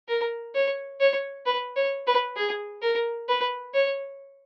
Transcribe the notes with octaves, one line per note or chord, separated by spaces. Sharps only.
A#4
C#5
C#5
B4
C#5
B4
G#4
A#4
B4
C#5